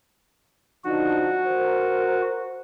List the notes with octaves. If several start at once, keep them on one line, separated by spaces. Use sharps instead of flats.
D3 F3 D#4 F#4
A#4 C5